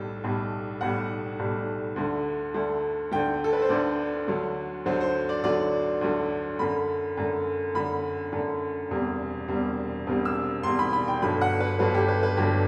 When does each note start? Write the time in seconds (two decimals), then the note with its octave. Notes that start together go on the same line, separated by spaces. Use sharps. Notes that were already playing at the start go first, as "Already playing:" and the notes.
Already playing: B1 A2 G3 A4
0.24 B1 A2 G3
0.81 B1 A2 G3 F#5
1.39 B1 A2 G3
1.96 D2 D3 A3
2.54 D2 D3 A3
3.12 D2 D3 A3 G5
3.44 A4
3.53 B4
3.62 C5
3.69 D2 D3 A3 D5
4.28 D2 D3 F#3 A3
4.85 D2 D3 F#3 A3 C5
5.01 C5
5.29 D5
5.43 D2 D3 F#3 A3 D5
6.01 D2 D3 F#3 A3
6.59 F#2 D3 A3 B5
7.17 F#2 D3 A3
7.75 F#2 D3 A3 B5
8.32 F#2 D3 A3
8.90 E1 E2 C3 G3
9.48 E1 E2 C3 G3
10.07 E1 E2 C3 G3
10.25 E6
10.63 E1 E2 C3 G3 C6
10.79 B5
10.93 B5
11.08 G5
11.22 G1 G2 F#3 A3 B5
11.41 F#5
11.60 B4
11.79 G1 G2 F#3 A3 B4
11.94 G4
12.08 B4
12.23 B4
12.37 G1 G2 F#3 A3 G4